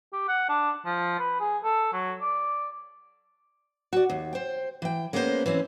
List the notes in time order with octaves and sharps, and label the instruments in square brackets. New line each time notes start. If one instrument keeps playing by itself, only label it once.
[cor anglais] G4
F#5
D4
F3
B4
G#4
A4
F#3
D5
[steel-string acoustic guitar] F#4 D5
D#2
C5 G5
E3 G5
G#3 A#3 B3 C#4 G4 C5
E3 C4 C#4